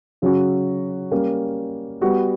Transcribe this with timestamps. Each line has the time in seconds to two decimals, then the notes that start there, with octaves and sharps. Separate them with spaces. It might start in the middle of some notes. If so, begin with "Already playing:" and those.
0.22 C#3 F#3 C#4 F#4
1.11 G3 A#3 C#4
2.01 G3 B3 F#4